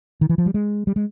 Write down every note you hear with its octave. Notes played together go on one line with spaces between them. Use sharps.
D#3
E3
F3
G3
G#3
G3
G#3